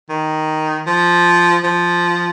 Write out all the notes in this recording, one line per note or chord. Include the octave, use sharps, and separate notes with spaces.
D#3
F3
F3